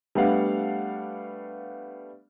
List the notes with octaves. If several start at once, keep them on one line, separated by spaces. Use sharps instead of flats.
G3 A3 B3 D4 F5 F#5